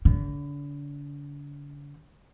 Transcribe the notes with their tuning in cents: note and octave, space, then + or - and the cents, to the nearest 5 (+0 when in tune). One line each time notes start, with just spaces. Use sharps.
D3 -40